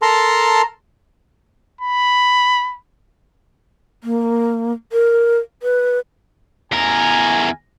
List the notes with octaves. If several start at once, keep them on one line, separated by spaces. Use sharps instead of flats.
A4 A#4 A5 A#5 C6
B5
A#3
A#4
B4
E2 A#4 G#5